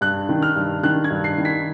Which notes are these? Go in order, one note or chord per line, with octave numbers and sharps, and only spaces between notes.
G2 F#6
D#3
F6
G2
D#3 F#6
G#6
G2
C7
D#3
B6